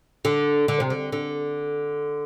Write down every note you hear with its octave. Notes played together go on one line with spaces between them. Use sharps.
D3
D3
C3
D3
D3